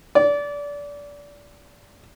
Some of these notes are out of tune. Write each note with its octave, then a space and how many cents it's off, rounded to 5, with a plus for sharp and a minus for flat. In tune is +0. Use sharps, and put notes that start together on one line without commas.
D5 -25